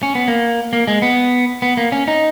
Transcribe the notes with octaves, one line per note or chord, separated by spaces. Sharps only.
C#4
B3
A#3
A#3
G#3
B3
B3
A#3
C#4
D#4